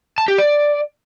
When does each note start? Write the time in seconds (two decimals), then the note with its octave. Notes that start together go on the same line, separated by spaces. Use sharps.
0.18 A5
0.28 G4
0.38 D5